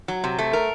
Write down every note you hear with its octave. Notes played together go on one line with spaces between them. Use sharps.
F#3
C3
A3
A#4